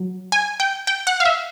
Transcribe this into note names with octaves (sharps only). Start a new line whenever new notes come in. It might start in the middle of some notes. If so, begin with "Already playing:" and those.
Already playing: F#3
G#5
G5
G5
F#5
F5
E5